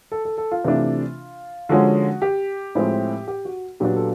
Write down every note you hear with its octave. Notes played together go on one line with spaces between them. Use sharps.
A4
A4
A4
F4
C3 E3 A3 D4
D3 F3 G#3 C#4 F#4
G4
A2 F3 G#3 C4
G4
F#4
A#2 F#3 B3 D4 G4
A4